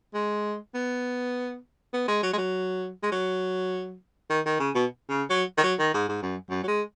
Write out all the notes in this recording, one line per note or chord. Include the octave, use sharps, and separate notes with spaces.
G#3
B3
B3
G#3
F#3
G#3
F#3
G#3
F#3
D#3
D#3
C#3
B2
C#3
F#3
D#3
F#3
D#3
G#2
G#2
F#2
F#2
F#3
G#3